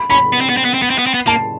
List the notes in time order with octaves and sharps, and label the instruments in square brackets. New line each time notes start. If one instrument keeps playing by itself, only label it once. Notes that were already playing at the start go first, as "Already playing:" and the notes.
Already playing: [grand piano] B5
[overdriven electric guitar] C#4 [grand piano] B5
[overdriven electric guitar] B3
C4
B3
C4
B3
C4
B3
C4
B3
C4
B3
[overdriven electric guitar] A#3 [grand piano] A5